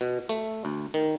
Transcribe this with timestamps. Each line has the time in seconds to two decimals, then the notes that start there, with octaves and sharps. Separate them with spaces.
0.01 B2
0.29 A3
0.65 D2
0.94 D#3